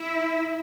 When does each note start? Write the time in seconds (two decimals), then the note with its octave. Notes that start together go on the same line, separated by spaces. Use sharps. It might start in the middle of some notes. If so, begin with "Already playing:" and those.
Already playing: E4 E5